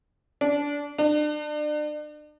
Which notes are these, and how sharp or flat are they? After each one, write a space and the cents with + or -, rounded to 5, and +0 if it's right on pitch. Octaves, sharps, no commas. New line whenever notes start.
D4 -20
D4 +40